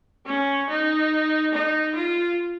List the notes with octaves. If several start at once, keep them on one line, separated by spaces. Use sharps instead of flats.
C#4
D#4
D#4
F4